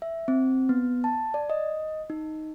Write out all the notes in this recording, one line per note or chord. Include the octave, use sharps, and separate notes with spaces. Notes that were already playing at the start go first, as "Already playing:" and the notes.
E5
C4
B3
A5
D5
D#5
D#4